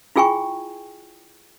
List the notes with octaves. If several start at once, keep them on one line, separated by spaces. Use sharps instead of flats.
E4 F4 G#4 G5 G#5 C#6